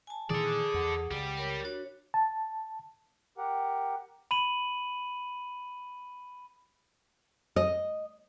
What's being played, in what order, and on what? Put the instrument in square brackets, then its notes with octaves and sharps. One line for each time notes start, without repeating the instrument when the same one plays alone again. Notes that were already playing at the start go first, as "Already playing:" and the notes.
[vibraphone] G#5 A5
[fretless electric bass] A#2 D#3 E3 [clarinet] G#4 [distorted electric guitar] A4 D5
[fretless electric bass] E2 [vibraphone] F#5
[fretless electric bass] C#2 [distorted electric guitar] G3 G4
[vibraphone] A#4 C#5
D4 F#4 C#5
[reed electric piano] A5
[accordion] G4 A#4 F#5
[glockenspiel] B5 D#7 F#7
[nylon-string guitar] D#5